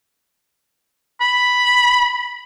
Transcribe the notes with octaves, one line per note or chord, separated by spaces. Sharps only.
B5